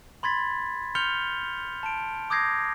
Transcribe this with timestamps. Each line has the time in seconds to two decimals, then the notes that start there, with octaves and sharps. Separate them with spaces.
0.23 B5 C6 G#6 A6 B6
0.95 C6 F6 G6 C#7 F7 G7
1.83 A5 D7
2.30 D6 D#6 G6 G#6 A#6 C7